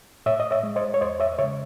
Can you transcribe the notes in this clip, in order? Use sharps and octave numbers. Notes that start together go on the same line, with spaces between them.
A2 C#5 E5
D#5
C#5 E5
G#3
C5 D#5
C#5
E2 C5 D#5
C#5 E5
C#3 G#3 C#5 E5